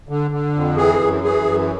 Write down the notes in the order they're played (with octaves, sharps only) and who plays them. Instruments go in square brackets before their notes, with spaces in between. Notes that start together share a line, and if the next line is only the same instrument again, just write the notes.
[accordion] D3
D3
F2
E3 G#4
F#2
E3 G#4
F#2